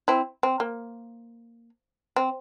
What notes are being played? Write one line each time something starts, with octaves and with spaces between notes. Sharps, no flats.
C4 E4
C4
A#3
C4